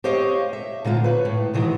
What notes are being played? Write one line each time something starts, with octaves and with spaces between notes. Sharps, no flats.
G4 C5 C#5 D#5 F5
E5
A#2 D3 A#3 F4
B4 C#5
A2
C3 D#3 E3 F#3 D#4